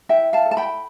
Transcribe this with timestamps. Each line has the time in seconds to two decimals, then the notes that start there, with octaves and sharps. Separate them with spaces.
0.09 E4 E5 G5
0.33 F5 A5
0.46 A4
0.51 A5
0.57 G5 B5